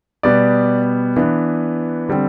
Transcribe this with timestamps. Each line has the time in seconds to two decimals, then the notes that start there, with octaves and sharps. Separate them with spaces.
0.23 B2 G3 B3 D5
1.16 E3 B3 D4
2.09 D3 G3 C4